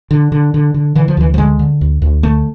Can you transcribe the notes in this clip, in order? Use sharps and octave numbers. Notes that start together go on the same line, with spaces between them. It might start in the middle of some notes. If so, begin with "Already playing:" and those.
D3
D3
D3
D3
D3 E3
F3
D2 E3
F3
D3 G#3
D3
D2
D2
D3 A3